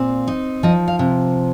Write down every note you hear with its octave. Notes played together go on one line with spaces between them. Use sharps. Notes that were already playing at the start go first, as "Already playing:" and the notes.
Already playing: A#2 C4
D#4
F3 D#5
F5
C3